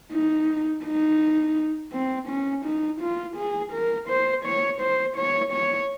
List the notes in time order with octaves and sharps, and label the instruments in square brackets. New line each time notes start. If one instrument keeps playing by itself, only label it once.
[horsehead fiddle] D#4
D#4
C4
C#4
D#4
F4
G#4
A#4
C5
C#5
C5
C#5
C#5